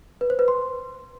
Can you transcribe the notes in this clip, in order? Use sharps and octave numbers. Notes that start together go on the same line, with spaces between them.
B4
C5
B4
C6